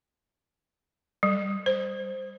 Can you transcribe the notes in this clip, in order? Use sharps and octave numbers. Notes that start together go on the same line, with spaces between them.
G3
C5